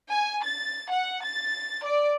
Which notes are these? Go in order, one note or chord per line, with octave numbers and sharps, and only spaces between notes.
G#5
A6
F#5
A6
D5